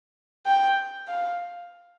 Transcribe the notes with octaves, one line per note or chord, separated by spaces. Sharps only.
G5
F5